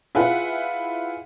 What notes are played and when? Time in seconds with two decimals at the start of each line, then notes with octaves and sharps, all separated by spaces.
0.15 E4 F4 G#4 B4 F#5